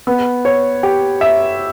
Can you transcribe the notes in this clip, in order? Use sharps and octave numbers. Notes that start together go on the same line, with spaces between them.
B3
C#5
G4
E5